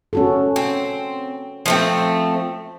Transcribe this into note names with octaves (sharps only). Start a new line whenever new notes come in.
C#4 F#4 A4
C4
F3 A3 C4